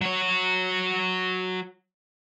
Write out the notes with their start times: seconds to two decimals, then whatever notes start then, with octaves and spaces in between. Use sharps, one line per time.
0.01 F#3 C#5